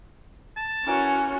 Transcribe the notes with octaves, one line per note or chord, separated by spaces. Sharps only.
A5
E3 C#4 F#4 A#4 G#5